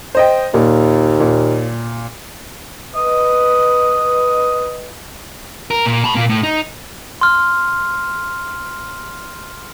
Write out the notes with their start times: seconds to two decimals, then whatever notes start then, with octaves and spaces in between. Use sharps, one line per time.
0.15 C5 D#5 G5
0.54 D#2 A#2
1.20 A#2
2.96 B4 D#5 D#6
5.71 A#4
5.86 A#2
6.04 A5 B5
6.15 A#2 A#3
6.29 A2
6.43 D#4
7.21 C6 F6